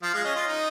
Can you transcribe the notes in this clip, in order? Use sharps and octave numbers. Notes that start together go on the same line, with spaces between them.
F3 F5
G#3 F5
C#4 D#5
F4
D#4